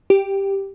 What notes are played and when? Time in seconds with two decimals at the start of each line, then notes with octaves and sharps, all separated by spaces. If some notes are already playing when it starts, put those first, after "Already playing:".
0.10 G4